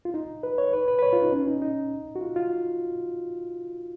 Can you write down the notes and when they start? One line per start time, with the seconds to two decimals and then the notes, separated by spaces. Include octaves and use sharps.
0.05 F4
0.14 D#4
0.43 B4
0.58 C#5
0.73 B4
0.88 B4
0.99 B4
1.03 C#5
1.13 F4
1.22 D#4
1.32 C#4
1.47 D#4
1.62 D#4
2.16 F#4
2.21 F4
2.36 F4